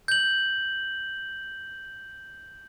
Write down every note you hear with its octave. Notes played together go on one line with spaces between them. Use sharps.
G6 F#7